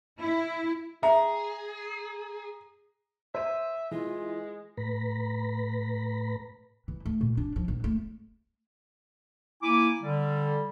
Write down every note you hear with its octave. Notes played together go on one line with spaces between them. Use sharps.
E4
G#4 E5 A#5
C5 E5 D#7
E3 G#3 F4
A2 B4 A#5 B5
E3
A3
A#2
D4
F3
A#1
A3
A#3 E4 G#5 D6
D3 G3